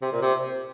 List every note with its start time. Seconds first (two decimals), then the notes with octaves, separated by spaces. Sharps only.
0.02 C3
0.12 A#2
0.21 C3